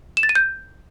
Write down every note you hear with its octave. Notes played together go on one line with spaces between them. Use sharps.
E7
A6
D#7
G6